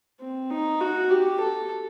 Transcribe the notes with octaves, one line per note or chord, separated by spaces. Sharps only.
C4
D#4
F#4
G4
A4